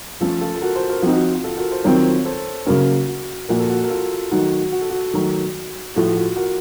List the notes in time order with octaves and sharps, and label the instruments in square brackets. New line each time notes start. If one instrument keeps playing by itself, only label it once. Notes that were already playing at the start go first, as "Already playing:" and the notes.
[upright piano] F3 A3 C#4 [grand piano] F4 A4
[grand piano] F4 A4
A4
F#4 A#4
A4 C5
F#4 A#4
[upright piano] F3 C4 D#4 [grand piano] F#4
[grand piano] F#4
F4
F#4
F4 A4
F#4 A#4
A4 C5
[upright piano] D#3 F#3 C4 F4 [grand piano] A#4 C#5
[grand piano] A4 C5
[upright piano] C#3 F#3 A#3 C#4 [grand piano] F#4 A#4
[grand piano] F#4
[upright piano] A#2 F3 A#3 [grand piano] F#4
[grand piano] A4
F#4
A#4
F4 A4
[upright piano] D#3 F#3 A3 D#4 [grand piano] F#4
[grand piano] F#4
A4
F#4
[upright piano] D#3 F#3 A3
[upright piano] A2 F3 A3 [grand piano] F#4
[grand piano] F4
F#4
F#4 A#4